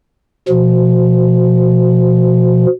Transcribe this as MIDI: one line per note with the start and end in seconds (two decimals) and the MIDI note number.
0.49 2.66 47
0.49 2.66 53